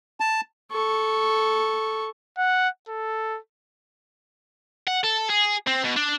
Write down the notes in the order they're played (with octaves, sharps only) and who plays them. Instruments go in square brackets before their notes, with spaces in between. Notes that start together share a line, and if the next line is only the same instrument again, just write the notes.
[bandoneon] A5
[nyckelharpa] A4 C#6
[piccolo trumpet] F#5
A4
[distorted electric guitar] F#5
A4
G#4
C4
B2
D4